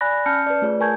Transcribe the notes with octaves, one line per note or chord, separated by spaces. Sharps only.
D5 G#5 B5 F#6 A#6
C#4 A5 F6 G6 C#7
B4 D5
A3 F4 G#4 C#5
A#4 G#5 A5 C#6 G6 G#6